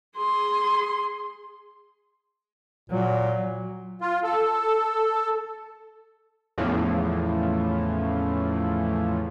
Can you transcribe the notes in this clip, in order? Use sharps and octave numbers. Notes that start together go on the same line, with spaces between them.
G#4 C6
A#2 F#3
F4
A4
E2 A2 C#3 E3 F3